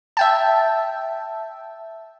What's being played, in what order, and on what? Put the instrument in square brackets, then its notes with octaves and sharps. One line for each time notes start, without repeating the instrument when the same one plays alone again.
[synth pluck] E5 G5 A5